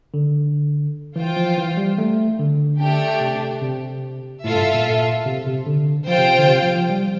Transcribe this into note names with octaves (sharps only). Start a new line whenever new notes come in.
D3
E3 F4 C5 G5
F3
E3
G3
A3
D3
A3 D4 G4
C3
C3
A2 F4 A4 E5
G2
A2
A#2
C3
C3
D3
F3 F4 C5 G5
C3
C3
D3
C3
F3
F3
G3